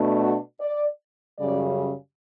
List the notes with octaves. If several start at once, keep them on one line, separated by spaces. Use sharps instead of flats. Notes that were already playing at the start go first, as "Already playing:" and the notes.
Already playing: B2 A3 D4
F#4
D5
F#2 C#3 G3 D5